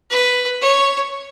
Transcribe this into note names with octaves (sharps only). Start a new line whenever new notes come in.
B4
C#5